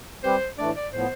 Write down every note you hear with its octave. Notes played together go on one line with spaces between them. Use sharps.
G3 C4 G4 B4 C5
A2 E3 A3 D4 D5
D5
A2 F3 B3 C5